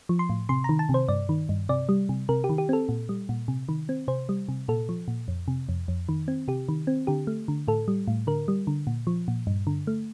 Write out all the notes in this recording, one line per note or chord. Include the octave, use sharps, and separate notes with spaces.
F3
C6
A2
C3 C6
D#3 A#5
A5
C3
C5
G2 D5
D#3
G2
C3 D5
G3
C3
C3 A#4
G4
D#3
G4
C4 A4
A#2
G3
A#2
C3
D#3
C4
C3 C5
G3
C3
A#2 A4
F3
A#2
F2
C3
F2
F2
D#3
C4
C3 G4
D#3
C4
D3 G4
A3
D3
A2 A4
G3
A2
D3 A#4
G3
D3
A#2
F3
A#2
G2
D3
A3